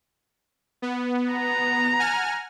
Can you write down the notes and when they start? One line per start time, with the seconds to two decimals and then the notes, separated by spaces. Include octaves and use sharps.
0.82 B3
1.32 A#5
1.99 F#5 G#5 F6